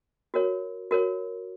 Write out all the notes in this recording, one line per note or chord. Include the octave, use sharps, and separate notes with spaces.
F#4 A#4 C#5
F#4 A#4 C#5